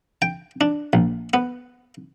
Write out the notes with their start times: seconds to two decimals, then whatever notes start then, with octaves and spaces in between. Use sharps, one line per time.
0.22 G5
0.61 D4
0.93 A#1
1.34 B3